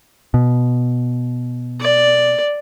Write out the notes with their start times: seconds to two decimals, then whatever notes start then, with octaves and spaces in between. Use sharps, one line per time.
0.34 B2
1.81 D5